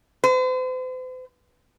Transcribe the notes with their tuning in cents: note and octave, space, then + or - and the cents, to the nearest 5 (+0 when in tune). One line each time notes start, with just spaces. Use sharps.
C5 -45